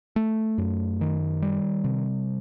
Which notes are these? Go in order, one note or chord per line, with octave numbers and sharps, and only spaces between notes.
A3
F#2
D#3
G3
C3